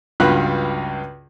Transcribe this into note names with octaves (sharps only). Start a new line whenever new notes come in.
C#2 G2 F4 F#4 B5 F#6